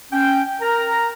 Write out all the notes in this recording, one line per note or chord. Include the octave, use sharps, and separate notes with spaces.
C#4 G5
A#4 A#5